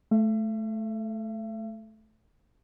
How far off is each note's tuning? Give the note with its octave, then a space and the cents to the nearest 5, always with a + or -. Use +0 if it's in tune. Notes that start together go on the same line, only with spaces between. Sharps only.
A3 -15 E5 +40